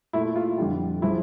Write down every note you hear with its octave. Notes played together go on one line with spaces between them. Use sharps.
A#2 A3 E4
F4
F2 D3 G3
C#3 F3 E4